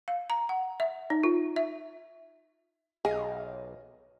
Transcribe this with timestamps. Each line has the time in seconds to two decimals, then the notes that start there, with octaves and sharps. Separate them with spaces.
0.08 F5
0.30 A#5
0.49 F#5
0.80 E5
1.10 D#4
1.23 F4
1.56 E5
3.05 B1 G#4 D#5 F5